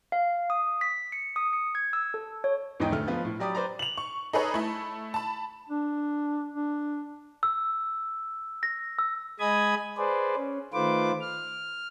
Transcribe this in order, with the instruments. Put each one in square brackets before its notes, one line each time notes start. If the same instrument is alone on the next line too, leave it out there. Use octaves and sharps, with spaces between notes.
[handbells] F5
D#6
B6
C#7
D#6
C#7
G#6
E6
A4
C#5
[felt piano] E2 G#2 D3 D#4 D#5 G5
D2 A3 F6
F3 B3 F4
A2
F#3 G4 D5 B5 D#6
B4 C5 D5 A#5
[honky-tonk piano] F7 F#7
C#6
D#4 G#4 A4 B4 C#5
A3 E4
A5 B5
[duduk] D4
D4
[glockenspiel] E6
A#6
E6
[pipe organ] G#3 D#5 G#5 B5 D#6 G#6
G#4 B4 C5 D5
C#4
D#3 A3 F4 B4 C5 D6
F6